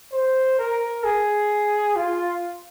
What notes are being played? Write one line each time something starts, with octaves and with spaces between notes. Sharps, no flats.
C5
A#4
G#4
F4